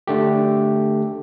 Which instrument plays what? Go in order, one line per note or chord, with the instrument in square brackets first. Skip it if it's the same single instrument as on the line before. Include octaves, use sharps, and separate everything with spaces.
[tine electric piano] D3 A3 G4